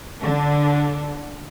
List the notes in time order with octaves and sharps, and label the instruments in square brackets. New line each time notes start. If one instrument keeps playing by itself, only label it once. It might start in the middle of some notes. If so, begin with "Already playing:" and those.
[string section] D3 D4